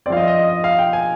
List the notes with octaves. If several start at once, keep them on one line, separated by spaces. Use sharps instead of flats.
F3 C4 D5 F5
D#5
D#5
D#5
D#5
F5
G5
G#5